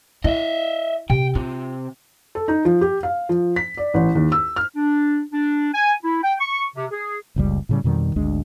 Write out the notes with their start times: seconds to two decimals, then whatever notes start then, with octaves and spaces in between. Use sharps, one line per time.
0.24 E4 D#5 E5
1.10 C3 G5
1.35 C3 F4
2.35 A4
2.48 D#4
2.65 F3
2.81 G4
3.03 F5
3.29 F3
3.56 B6
3.77 D5
3.94 A1
4.15 D#2
4.32 E6
4.56 F6
4.75 D4
5.33 D4
5.74 G#5
6.03 E4
6.22 G5
6.40 C#6
6.76 C3
6.91 G#4
7.36 F#1 C#2 G3
7.69 A2 C#3 G3
7.84 F2 B2 D#3 G3
8.16 G#1 D2 G#3 D4